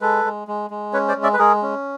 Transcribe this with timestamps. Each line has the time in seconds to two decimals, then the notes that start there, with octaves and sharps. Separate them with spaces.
0.01 G#3 A4 B4
0.24 G#3
0.48 G#3
0.70 G#3
0.93 C#4 B4 C#5
1.08 C5 D5
1.16 G#3
1.23 D5 E5
1.34 B4
1.39 G#3 G#4 A#4
1.63 C#4